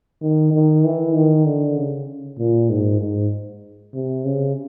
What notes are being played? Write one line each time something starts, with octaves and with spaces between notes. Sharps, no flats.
D#3
D#3
E3
D#3
D3
C#3
A#2
G#2
G#2
C3
C#3